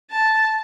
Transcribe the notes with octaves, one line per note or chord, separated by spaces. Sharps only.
A5